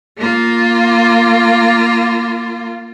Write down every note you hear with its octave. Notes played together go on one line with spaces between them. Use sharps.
A#3 F4